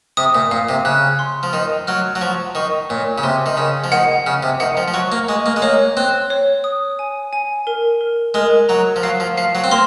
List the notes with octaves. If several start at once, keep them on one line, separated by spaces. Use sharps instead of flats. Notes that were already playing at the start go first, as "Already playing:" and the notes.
C3 D#6
A#2
A#2 F5
C3
C#3 F#6
C6
F3
D#3 F6
F#3 F6
F#3
F3 C#6
D#3 C#6
A#2 C#5
C#3
C3 C6
D#3
C#3 G#4
F3
D#3 F#5
C#3 F6
C3
D#3 F#5
F3
F3
F#3 C#6
A#3
G#3 C#6
A#3
G#3
A#3 C#5
C4 F#6
C#5
D#6
G#5
G#5
A#4
A#4
G#3 A#4
F#3 A#5
F3
F#3 F5
F3
F3 F5
F#3
C4
A#3 C6